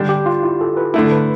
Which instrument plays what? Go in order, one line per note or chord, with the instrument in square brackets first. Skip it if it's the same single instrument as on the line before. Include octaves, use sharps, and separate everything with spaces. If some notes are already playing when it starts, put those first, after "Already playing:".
Already playing: [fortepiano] D3 G3 D4
[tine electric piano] G4
F4
E4
A4
B4
[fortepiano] D3 A3 E4 [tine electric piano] A4
[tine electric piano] B4